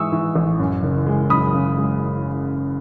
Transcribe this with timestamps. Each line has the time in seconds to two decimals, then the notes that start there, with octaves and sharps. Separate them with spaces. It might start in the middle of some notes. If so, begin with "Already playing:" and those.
Already playing: G#2 E3 G#3 C#6 D#6 E6
0.12 E3
0.36 A1
0.59 F#2
0.83 F#1
1.06 G#3
1.30 F#2 B5 D#6
1.54 C#3
1.77 G#3